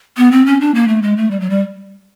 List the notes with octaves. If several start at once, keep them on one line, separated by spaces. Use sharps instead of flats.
B3
C4
C#4
D4
A#3
A3
G#3
A3
G3
F#3
G3